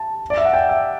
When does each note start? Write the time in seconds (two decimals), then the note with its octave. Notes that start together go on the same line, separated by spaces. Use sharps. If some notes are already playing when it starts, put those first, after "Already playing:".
Already playing: A5
0.30 D5
0.38 E5
0.45 F#5
0.54 G5
0.69 E5